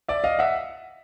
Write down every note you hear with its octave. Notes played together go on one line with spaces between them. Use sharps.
D5 E5
D#5 F5
E5 F#5